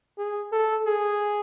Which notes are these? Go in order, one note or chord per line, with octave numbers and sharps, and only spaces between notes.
G#4
A4
G#4